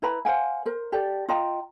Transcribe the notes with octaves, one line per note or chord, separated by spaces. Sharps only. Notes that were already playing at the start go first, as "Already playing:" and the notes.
E4 B4 A#5 B5
C5 F5 F#5 G#5
A#4 C5
G4 A4 D5
F4 D#5 G5 A#5